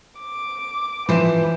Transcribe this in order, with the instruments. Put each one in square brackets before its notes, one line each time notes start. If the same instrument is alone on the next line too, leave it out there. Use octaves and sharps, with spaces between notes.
[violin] D6
[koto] E3 C5 [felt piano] F3 E7 [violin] B4